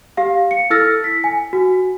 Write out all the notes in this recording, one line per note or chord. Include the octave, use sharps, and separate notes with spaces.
G4 F5
C#7
E4 A4 E6 F6 A6 A#6
B6
G#5
F#4